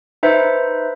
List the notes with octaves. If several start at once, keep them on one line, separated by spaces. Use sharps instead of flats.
D#4 B4 C5 E5